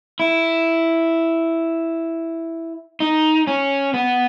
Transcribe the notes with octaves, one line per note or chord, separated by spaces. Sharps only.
E4
D#4
C#4
B3